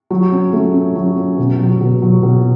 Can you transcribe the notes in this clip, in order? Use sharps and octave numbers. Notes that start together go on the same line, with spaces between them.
F#3
C#4
A3
C#4
F#3
C#4
B2
F#3
B2
F#3
B2